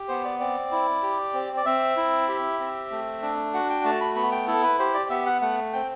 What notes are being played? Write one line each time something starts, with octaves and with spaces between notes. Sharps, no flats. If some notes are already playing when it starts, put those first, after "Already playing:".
Already playing: G4
B3 C5
D5
C4 D5
E4
G4
C4
D5
C4 E5
E4
G4
C4
A3
D4
F#4 F#5
G5
A3 A5
B5
B3 B5
G5
E4 A4
B4
G4 C5
D5
B3 E5
F#5
A3 F#5
C4 G5